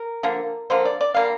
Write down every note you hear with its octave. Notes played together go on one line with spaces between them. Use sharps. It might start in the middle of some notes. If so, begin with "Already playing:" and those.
Already playing: A#4
D3 F3 A#3
D3 F3 A#3 C5
D5
D5
D3 G3 A#3 F5